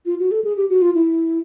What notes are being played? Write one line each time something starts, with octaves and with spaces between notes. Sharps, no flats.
F4
F#4
A4
G#4
G4
F#4
F4
E4